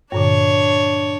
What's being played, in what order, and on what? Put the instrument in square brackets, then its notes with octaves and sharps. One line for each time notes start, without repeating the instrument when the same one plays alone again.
[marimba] G2 A#2 D3 [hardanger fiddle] D4 C#5